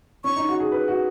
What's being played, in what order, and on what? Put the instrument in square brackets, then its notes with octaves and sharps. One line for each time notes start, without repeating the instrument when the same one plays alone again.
[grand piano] C#4 [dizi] C#6
[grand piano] D#4
F#4
G#4
B4
F#4